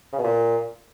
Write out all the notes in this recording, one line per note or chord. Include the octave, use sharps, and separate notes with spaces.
C#3
B2
A#2